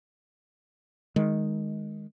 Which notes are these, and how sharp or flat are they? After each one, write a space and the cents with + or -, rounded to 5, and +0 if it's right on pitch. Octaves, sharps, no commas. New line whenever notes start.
D#3 +0 G#3 +5